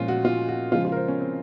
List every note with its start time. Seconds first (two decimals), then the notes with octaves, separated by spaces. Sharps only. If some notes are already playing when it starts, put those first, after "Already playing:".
Already playing: A#2 F3 G#3 C#4 F4
0.08 F#4
0.25 F4
0.48 F#4
0.72 C#3 F3 G#3 F4
0.85 F4
0.92 A#4
0.96 C5
1.08 C#4
1.20 C4